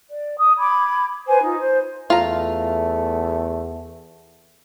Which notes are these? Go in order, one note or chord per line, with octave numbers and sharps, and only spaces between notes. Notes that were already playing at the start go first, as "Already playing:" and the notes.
D5
D#6
B5 D6 G#6
B4 C5 G#5
D#4 F4
C5
E2 A3 F4 A#5